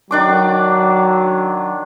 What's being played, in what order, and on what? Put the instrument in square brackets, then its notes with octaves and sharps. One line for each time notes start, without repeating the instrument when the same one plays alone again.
[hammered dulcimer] D#3 D4 D6 [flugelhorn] F#3